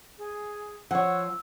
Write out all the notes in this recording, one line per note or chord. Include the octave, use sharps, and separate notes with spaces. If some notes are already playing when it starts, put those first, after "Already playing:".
G#4
F3 C#5 F#5 E6